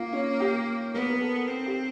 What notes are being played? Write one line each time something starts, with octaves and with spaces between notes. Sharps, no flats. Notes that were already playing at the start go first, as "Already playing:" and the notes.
Already playing: A#3 F4
C#4
G4
B3 A#4
A#4
A4
C4
G4